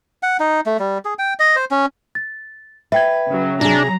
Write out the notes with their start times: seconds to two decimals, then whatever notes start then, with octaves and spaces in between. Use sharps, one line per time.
0.23 F#5
0.40 D#4
0.66 A3
0.79 G3
1.05 G#4
1.19 G5
1.39 D#5
1.56 C5
1.71 C#4
2.15 A6
2.92 B4 E5 G5 G#6
3.30 C#3 F#3
3.61 C3 F#3 D4 G#4 A#5